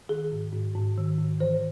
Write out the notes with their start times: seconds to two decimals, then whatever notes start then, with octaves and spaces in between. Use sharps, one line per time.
0.09 D#3 G#4
0.32 G#2
0.53 G#2
0.75 G#2
0.98 D#3
1.19 G#2
1.40 E3 C5